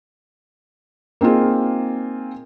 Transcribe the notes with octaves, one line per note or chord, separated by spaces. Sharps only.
A#3 C4 D#4 F4 G#4